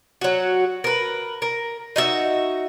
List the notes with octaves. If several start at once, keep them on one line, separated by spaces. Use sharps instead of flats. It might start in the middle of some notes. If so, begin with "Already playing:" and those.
F#3 F#4
A#4 B4
A#4
D#4 F#4 E5